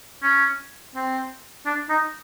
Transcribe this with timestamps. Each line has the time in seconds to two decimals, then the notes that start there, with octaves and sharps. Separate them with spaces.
0.23 C#4
0.95 C4
1.66 D4
1.90 D#4